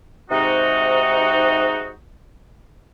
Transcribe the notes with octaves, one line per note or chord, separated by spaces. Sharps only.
G#2 C3 D#4 F#4